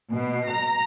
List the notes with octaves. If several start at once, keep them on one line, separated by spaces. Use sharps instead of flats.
B2
A#5